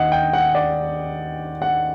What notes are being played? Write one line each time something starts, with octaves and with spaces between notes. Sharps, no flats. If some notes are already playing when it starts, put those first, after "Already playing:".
Already playing: D#2 D#5 F#5
G5
F#5
D5
F#5